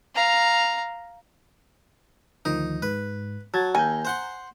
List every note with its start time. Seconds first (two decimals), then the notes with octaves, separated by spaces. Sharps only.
0.15 F5 A#5
2.45 D2 D#3 F3 D#4
2.82 G#2 B4
3.54 F#3 A5 G#6 A6
3.75 D#2 G#5 A#5 G6
4.05 C5 F#5 C6